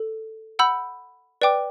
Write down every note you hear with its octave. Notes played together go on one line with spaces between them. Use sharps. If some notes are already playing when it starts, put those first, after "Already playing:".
Already playing: A4
F#5 B5 E6 G6
B4 D5 G5 D6